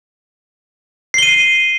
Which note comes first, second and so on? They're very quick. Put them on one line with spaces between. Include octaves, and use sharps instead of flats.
C7 G7 D#7